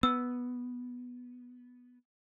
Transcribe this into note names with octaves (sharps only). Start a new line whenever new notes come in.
B3 E6